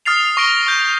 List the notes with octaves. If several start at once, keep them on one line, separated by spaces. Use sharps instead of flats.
D#6 F6 A6 C7 F7
C#6 A#6 D7 G7
C#6 G6